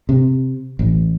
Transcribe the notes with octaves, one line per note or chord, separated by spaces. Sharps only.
C3
A1